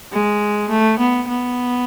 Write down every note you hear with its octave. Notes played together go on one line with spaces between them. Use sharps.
G#3
A3
B3
B3